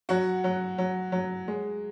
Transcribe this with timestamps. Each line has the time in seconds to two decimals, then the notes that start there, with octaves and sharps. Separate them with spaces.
0.09 F#3 F#4 F#5
0.44 F#3
0.78 F#3
1.12 F#3
1.48 G#3